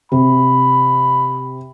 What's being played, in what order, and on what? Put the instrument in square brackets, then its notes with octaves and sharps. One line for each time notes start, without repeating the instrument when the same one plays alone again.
[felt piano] C3 [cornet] B5